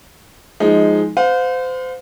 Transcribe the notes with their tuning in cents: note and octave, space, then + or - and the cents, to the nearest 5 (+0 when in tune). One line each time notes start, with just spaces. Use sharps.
F3 +0 G#3 +0 D#4 +10
C5 -30 F5 +35